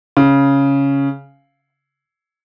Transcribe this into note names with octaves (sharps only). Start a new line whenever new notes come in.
C#3